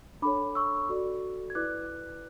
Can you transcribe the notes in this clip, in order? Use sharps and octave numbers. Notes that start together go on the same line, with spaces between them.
D4 A4 C#5 B5 D6
C#6 E6
F#4 A4 D5
G#6
E4 B4 D5 D6 F#6